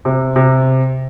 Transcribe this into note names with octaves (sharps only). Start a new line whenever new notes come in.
C3
C3